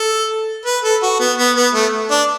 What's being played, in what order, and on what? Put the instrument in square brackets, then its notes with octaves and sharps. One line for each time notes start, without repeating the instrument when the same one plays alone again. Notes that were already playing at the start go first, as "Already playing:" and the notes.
Already playing: [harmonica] A4
B4
A4
F#4
B3
B3
B3
A3
D4